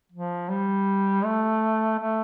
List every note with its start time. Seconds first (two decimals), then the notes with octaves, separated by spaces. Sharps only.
0.12 F3
0.49 G3
1.24 A3
1.99 A3